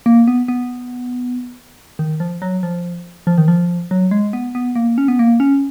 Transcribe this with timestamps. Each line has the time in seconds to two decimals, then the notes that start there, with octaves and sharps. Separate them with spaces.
0.06 A#3
0.28 B3
0.48 B3
1.99 D#3
2.20 F3
2.42 F#3
2.63 F3
3.27 F3
3.38 D#3
3.48 F3
3.91 F#3
4.11 G#3
4.33 B3
4.55 B3
4.76 A#3
4.98 C#4
5.08 B3
5.19 A#3
5.40 C#4